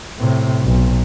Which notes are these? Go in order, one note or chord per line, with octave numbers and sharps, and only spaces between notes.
A2 C3
B1